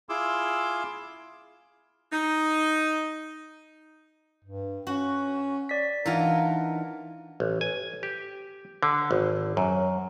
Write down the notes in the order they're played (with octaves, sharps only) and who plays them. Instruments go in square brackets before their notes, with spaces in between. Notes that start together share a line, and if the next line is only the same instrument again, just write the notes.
[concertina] E4 F4 G#4 C6 D6 E6
[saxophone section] D#4
[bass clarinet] G2
[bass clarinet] C#4 [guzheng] F#4
[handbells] D5 B6
[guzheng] E3 F4 A#5 [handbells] D4 D#4 F#5 [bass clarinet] A#4
[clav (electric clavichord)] A1
G#5
G4
D3
G#1
F#2